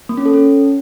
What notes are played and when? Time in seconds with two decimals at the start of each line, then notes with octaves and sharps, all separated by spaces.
0.09 A#3
0.17 C#4
0.25 A4
0.34 C#4